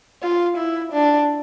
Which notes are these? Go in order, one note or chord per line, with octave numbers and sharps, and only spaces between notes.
F4
E4
D4